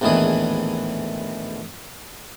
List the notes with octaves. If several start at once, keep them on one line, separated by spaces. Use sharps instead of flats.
A#1 E2 A2 D#3 E3 G#4